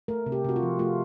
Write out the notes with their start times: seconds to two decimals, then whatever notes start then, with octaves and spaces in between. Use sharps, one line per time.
0.08 A3 A#4
0.26 C3
0.32 G4
0.44 C3 F#4
0.56 F4
0.63 F3
0.79 A3 F4